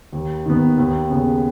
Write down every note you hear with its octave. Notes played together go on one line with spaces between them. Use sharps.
D#2
D#3 B3
D#2
C#3 B3